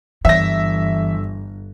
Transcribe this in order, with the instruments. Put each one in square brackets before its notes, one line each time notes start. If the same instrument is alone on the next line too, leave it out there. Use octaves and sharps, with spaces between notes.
[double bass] G1 [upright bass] E3 [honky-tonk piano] E5 A#6